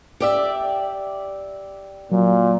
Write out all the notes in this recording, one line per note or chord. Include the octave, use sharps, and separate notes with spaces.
G4 D5 E5
A#2 F#3